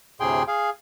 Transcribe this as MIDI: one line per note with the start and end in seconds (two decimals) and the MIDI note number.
0.20 0.43 38
0.20 0.43 45
0.20 0.43 48
0.20 0.43 68
0.20 0.43 79
0.20 0.43 84
0.47 0.70 68
0.47 0.70 77